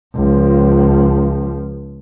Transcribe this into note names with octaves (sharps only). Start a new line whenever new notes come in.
C#2 F3